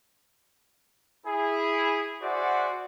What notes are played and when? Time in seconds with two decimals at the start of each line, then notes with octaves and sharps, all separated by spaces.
1.27 E4 G#4
2.22 F#4 G#4 C5 D5 E5 F#5